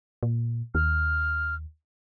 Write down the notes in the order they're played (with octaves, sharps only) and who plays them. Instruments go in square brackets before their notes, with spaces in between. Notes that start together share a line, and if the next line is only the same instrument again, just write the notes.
[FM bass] A#2
[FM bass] D#2 [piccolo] F6